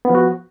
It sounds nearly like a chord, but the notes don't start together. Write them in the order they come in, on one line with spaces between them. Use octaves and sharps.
B3 F3 F#4